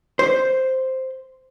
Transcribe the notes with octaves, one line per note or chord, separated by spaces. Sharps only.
C5